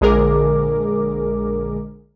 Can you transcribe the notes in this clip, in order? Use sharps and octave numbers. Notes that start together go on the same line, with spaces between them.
A#1 D3 G#3 G#4 A#4 D6